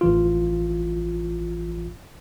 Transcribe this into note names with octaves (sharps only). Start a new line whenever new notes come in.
A1 E3 F4